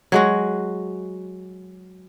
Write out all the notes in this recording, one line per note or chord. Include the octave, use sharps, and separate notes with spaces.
F#3 G#3 F#4